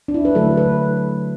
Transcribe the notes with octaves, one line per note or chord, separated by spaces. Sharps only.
D4
E4
B4
D3 F#3 A3 A4
B4